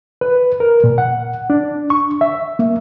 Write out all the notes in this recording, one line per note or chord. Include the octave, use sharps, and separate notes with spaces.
B4
A#4
A#2
F#5
D4
C#6
E5
A#3